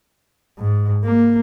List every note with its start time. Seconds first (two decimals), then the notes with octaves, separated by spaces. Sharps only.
0.58 G#2
1.04 A#3